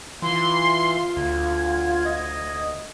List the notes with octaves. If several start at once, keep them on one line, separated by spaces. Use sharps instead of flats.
E3 F4 C6
D2 G#6
D#5